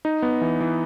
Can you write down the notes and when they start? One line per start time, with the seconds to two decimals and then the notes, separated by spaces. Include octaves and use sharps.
0.05 D#4
0.22 B3
0.41 E3
0.60 E3